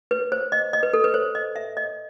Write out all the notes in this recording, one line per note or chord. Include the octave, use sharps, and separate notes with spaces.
B4
C5
D#5
D#5
B4
A4
B4
C5
D#5
E5
D#5